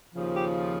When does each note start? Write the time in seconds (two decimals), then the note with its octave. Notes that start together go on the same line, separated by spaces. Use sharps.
0.15 D#2 C#3 F3
0.33 G4